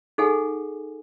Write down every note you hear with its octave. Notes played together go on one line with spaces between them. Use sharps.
D#4 G#4 A4 F#5 G#5